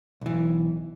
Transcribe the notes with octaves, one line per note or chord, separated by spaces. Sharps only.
B1 E3